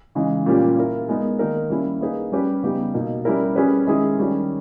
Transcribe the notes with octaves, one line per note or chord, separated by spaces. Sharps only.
C#3 E3 G#3 D#4
A#2 G3 A#3 C#4 G4
A#3 E4 A#4
G#3 B3 D#4 A#4
D#3 A#3 D#4 A#4
G3 A#3 C#4 E4
A#3 D#4 G#4 B4
G3 C#4 G4 B4
C#3 G3 B3 D#4 G4
B2 A#3 D#4
G3 C#4 E4 A#4
G3 C#4 G#4 B4
D#3 G#3 C#4 E4 G#4
D#3 G3 C#4